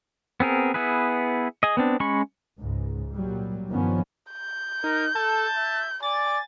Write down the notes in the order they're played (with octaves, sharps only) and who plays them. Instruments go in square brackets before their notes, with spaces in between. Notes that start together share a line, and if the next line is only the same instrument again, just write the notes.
[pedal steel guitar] B3 C4 G#4 A#4
B3 E4 G#4 B4
G#4 D#5
B3 C4 D4
G#3 C#4 B5 C#6
[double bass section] C#2 G#2
A#2 F#3 G3
G2 D#3 F3 B3 C#4
[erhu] G6
[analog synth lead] D#4 [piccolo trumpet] A#4
[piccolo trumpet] A4 [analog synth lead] A5
[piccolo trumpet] E5
[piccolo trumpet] D5 [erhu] G#5 [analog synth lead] A6